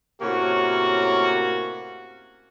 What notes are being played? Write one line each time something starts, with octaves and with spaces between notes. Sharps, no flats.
A2 C3 A#3 C#4 F#4